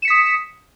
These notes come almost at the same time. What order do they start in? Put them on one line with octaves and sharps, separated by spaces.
E7 C#7 B6 D#6